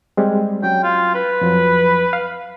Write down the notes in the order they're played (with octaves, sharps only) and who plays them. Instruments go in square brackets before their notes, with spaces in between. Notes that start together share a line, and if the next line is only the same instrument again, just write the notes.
[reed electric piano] G3 G#3 C4
[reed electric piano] F#3 C#4 [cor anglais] G5
[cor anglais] F4
B4
[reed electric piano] F2 F3 F#3
F5